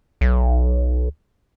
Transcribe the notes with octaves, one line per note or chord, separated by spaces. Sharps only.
B1